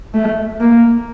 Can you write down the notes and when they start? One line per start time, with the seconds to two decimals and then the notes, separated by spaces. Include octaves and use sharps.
0.14 A3
0.61 A#3